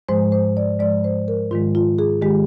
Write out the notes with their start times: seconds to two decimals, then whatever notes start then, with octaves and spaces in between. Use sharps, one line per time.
0.09 G#2 F3 G#3 C5
0.32 C5
0.57 D5
0.79 G#2 F3 G#3 D5
1.04 C5
1.28 A#4
1.51 G#2 D#3 G#3 F4
1.75 F4
1.99 G#4
2.22 D#3 G#3 G4